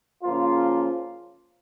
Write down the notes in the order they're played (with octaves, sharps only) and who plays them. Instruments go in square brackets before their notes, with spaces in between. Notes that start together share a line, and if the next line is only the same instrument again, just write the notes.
[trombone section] C#3 F3 A#3 F4